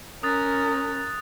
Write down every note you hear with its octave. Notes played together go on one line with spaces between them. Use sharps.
C#4 A#4 D#6 F#6 A6